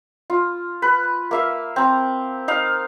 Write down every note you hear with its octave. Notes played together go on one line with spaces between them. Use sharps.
F4
B4
A#3 E5 F5
C4 A#5
D#4 F5